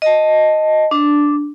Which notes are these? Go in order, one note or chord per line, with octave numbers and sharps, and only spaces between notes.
D#5 A5
D4